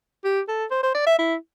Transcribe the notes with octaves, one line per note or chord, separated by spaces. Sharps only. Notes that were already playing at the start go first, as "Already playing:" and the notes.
G4
A4
C5
C5
D5
E5
E4